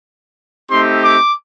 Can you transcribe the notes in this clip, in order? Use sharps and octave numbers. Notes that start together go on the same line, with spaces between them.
A3 C4 D#4 G4 C6
D6